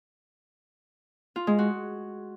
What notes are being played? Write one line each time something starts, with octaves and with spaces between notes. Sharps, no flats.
F4
G#3
F#4